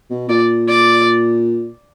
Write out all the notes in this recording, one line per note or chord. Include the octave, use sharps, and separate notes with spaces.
B2
A#2 D5
D5